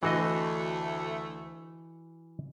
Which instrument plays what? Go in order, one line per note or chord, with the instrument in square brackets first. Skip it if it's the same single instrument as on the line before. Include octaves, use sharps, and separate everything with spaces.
[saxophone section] D2 A3 [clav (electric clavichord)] E3 F#4 D#5